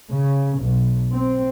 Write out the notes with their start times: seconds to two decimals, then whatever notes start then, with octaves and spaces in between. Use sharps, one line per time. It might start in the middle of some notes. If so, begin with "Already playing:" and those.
0.10 C#3
0.59 B1
1.13 C4